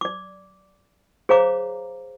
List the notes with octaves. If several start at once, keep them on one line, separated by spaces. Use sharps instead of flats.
D5 D6
G#4 C5 C#5 F5 A#5 D6